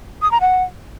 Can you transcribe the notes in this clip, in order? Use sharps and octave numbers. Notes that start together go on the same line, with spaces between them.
D#6
A#5
F#5